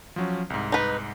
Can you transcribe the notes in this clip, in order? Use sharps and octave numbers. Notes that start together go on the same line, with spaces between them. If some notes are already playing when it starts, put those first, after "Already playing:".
F3 F#3 C#4
C2 G#2
D#4 B4